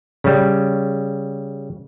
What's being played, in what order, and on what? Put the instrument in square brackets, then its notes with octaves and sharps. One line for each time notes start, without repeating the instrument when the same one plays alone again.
[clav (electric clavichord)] C#3 G3